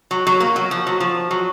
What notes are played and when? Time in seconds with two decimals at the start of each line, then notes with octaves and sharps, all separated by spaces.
0.11 F#3
0.27 F#3
0.40 A#3
0.56 F#3
0.71 F3
0.87 F#3
1.00 F3
1.31 F#3